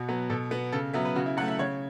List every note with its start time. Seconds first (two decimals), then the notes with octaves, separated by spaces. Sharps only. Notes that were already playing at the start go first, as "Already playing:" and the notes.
Already playing: B2 F#4
0.08 F#3 B3
0.30 B2 A4
0.51 B3 F#4
0.72 C#3 A4
0.94 F#3 B3 E5
1.05 B4
1.16 C#3 F#4
1.26 E4
1.37 F#3 F#5
1.40 A3
1.48 E5
1.59 C#3 C#5